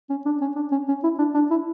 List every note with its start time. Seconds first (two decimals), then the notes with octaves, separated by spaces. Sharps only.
0.10 C#4
0.25 D4
0.41 C#4
0.56 D4
0.71 C#4
0.88 C#4
1.03 E4
1.18 D4
1.34 D4
1.50 E4